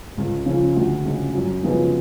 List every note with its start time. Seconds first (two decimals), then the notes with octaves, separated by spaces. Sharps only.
0.17 C#2
0.46 C#3 F3
0.76 D2
1.05 C#3 G#3
1.34 F#2
1.63 C#3 F3 G#3 B3